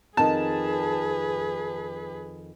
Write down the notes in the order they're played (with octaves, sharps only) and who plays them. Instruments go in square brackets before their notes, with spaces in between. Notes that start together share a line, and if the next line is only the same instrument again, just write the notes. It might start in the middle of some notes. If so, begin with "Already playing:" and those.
[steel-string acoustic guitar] F2 D#3 [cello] G#4 B4 [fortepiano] A5